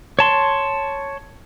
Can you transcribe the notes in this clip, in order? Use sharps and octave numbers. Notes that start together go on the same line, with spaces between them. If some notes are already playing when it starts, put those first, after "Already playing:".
C#5 A5 C6